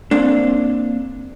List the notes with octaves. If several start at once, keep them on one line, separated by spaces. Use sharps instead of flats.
A#3 C4 D4